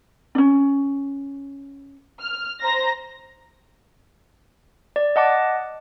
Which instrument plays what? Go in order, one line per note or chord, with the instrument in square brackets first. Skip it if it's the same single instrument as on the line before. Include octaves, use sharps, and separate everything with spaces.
[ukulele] C#4 D4
[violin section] F6
C5 A#5 A#6
[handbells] D5
D#5 F#5 A5 D6